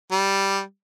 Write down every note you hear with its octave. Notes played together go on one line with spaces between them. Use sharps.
G3